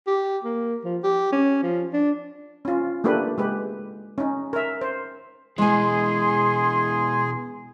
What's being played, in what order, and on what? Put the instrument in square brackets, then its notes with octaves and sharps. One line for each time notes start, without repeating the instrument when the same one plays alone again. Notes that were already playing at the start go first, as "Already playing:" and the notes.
[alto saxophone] G4
A#3
F3
G4
C#4
F3
D4
[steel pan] C#4 F4
A3 A#3 D4 G4 B4
G#3 G4 B4
C#4 D#4
A#4 E5
C5
[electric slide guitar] B2 E3 [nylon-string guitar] G#3 G#5 [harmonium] G#4 [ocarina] C6